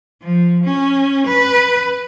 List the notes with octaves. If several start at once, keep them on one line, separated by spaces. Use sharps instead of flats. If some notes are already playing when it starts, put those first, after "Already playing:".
F3
C#4
B4